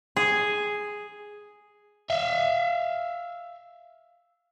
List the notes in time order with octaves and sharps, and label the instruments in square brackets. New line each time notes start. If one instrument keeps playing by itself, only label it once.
[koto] G#4
[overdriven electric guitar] E5 F5